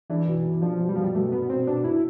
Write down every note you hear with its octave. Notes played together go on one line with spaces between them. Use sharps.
E3 D4
B2
B2
F3 D4
B2
G3
B2 F3
G3
B2 A3
B2 B3
B2 C4
B2 D4
B2 E4